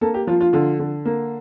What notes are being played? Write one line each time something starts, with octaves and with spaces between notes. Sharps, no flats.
A#3 A4
G4
F3 F4
F4
D3 F4
D3
A#3